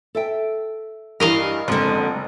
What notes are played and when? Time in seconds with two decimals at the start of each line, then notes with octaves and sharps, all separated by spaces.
0.15 A4 E5 G5
1.20 G2 E3 A#4 D#5 F5
1.68 F#1 D3 F3 G3 G#3 C4